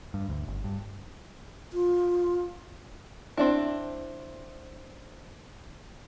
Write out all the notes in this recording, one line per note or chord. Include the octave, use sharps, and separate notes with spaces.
G2
D2
G1
G2
F4
C4 D4 E4